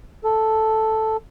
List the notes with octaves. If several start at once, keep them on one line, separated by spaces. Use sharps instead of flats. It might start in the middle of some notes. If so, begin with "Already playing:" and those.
A4